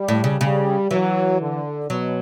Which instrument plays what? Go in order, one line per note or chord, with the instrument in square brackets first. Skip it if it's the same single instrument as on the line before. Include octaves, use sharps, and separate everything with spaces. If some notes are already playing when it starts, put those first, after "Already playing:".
Already playing: [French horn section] G3
[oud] A2
C#3
[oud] C#3 [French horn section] G3
[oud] E3 [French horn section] F#3
[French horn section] D3
[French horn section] B2 [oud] F#3